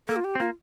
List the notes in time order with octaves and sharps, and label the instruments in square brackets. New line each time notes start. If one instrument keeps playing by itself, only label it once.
[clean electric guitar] A#3 [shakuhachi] A4
[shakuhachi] F4
G4
[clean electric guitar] C4
[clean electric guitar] A#3 [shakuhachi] F4